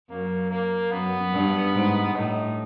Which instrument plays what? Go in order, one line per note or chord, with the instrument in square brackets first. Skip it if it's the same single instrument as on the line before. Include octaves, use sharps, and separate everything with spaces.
[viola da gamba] F#2 [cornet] A#3
[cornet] A#3
[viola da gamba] F#2 [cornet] B3
[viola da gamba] G2
G#2
[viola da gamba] A2 [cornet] D#4